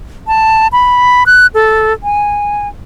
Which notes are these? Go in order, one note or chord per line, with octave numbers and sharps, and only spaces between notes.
A5
B5
F#6
A4
G#5